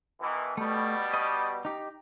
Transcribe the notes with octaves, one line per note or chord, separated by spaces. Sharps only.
B2 D#3 E3
B2 G3 A3
B4 D#5
D#4 G4